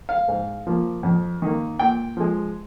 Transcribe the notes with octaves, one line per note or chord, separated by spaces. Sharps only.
F5
G#2
F3 A#3
F2
D#3 A#3
A#2 G5
F3 G#3